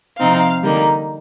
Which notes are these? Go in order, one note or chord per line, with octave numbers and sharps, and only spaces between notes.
C3 F3 C4 D#4 F5
D3 G3 A#3 D#4